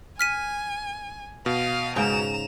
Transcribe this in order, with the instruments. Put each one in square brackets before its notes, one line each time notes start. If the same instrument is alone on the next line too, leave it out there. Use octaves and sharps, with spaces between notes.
[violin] G#5 [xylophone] F6 B6 D#7
[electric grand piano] B2 [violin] F5 D#6
[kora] G#2 C#3 G5 [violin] A#5 E7